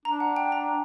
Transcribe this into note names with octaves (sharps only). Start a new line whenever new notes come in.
D4 A#5
F#5
G5
A#5